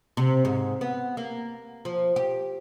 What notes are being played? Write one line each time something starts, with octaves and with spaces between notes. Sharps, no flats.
C3
G#2
B3
A#3
F3
G4